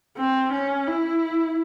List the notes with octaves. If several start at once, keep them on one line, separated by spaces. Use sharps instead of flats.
C4
C#4
E4